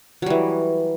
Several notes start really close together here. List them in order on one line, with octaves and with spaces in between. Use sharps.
F#3 G3 E3